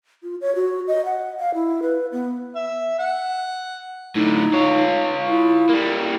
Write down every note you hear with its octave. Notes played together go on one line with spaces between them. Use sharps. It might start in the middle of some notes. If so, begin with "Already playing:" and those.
F4
C#5
F#4
D#5
F#5
F5
E4
B4
B3
E5
F#5
A2 D3 D#4
F4 C#5
E4
G3 A#3